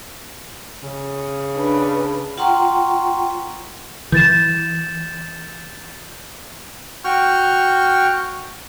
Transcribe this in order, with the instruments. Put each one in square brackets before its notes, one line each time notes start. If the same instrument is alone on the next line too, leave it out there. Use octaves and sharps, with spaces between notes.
[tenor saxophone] C#3
[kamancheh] D4 B4
[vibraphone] F4 F#5 G5 A#5 C6 C#6
[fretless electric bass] E3 [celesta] G6 A6 E7
[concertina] F#4 G5 C#6 F6